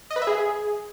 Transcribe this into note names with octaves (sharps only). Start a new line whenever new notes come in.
D#5
B4
E5
G#4